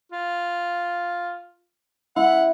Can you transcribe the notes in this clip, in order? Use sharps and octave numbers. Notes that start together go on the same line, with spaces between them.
F4
E4 F#5